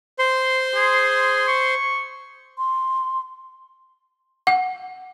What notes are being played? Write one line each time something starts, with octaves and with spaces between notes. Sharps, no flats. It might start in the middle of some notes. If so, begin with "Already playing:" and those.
C5 C6
G#4
C#6
C6
F#5